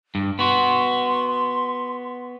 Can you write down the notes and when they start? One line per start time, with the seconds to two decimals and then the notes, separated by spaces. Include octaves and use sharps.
0.15 G2
0.39 B3 F#4 C6